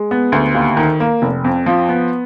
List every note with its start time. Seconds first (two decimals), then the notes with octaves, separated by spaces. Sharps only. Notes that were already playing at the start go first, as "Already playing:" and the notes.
Already playing: G#3
0.11 B3
0.32 D2
0.55 D#2
0.77 D#3
1.00 A#3
1.22 F1
1.44 F2
1.66 F3
1.89 B3